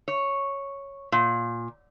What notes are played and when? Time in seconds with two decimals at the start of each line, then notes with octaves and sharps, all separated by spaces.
0.08 C#5
1.12 A#2